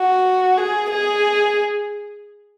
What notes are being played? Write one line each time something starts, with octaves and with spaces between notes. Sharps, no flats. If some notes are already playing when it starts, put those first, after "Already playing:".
Already playing: F#4
G#4
G#4